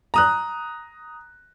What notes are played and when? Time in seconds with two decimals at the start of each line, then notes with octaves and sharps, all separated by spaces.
0.14 A#5 D#6 F#6